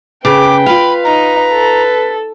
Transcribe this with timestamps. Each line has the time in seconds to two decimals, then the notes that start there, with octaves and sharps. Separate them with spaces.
0.25 C#3 B4 G5 D6
0.66 F4 F5 B5
1.05 D#4 A#5
1.52 A4